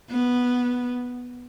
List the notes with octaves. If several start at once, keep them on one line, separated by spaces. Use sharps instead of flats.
B3